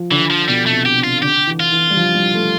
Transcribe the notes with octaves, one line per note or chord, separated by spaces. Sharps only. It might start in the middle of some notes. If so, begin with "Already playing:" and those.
Already playing: F3
D3 E3
F3
B2 G3
B2 A3
C3
G4
C3
F4
D3 G4
E3
F4
E3
G3
F3
G3
A3